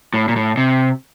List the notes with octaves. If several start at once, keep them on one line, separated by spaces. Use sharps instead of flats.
A2
A#2
A2
C3